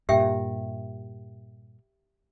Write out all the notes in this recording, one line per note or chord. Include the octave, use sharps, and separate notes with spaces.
G2 A#2 G4 E5 G5